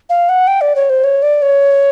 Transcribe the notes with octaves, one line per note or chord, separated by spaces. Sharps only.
F5
F#5
G5
D5
C#5
C5
C#5
D5
C#5